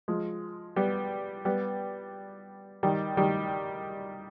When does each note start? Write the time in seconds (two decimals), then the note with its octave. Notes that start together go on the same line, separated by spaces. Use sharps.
0.08 F3 G#3
0.76 G3 B3
1.45 G3 B3
2.83 D#3 G3
3.17 D#3 G3